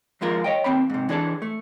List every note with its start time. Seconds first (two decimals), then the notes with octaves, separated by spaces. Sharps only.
0.21 D#2 F3 G#3 F4 A#4
0.44 C#5 D#5 G5
0.64 D#2 C4 G5 B5
0.90 G#2 C3
1.09 E3 D4 G#4 A4
1.42 A3